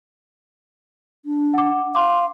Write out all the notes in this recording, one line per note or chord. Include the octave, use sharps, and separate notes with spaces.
D4
F#5 D6
F5 C6 D6